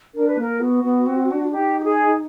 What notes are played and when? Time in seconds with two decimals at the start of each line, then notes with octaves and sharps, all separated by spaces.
0.14 D4 A#4
0.28 B4
0.38 A#3 A#4
0.60 B3 F#4
0.84 B3
1.06 C4
1.30 D4
1.52 D#4 G4
1.79 G4
1.83 G#4